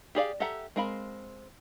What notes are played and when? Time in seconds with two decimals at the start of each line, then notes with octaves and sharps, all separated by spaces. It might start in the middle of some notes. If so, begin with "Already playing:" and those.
0.15 G4 G#4 D5 F5
0.40 G4 A4 E5 F#5 A#5
0.76 G#3 C4 A#4 F5 B5